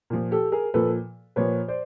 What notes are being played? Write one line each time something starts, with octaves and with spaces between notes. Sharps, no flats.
A#2 F3
G4 A4
G#4 A#4
A#2 F3 A4 B4
A#2 F3 B4 C#5
C5 D5